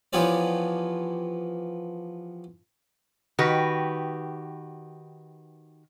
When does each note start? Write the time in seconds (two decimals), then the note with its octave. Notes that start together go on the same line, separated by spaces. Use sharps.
0.13 E3 F3 B3 G4 C#5 D5
3.39 D#3 F#4 G4 B4